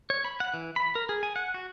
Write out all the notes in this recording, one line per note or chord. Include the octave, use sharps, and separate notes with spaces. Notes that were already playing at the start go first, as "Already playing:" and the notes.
C#5
B5
F#5
E3
B5
A#4
G#4
G#5
F#5
F#4